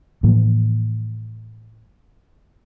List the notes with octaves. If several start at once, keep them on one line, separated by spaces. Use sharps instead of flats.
A2 E3 F3 A#3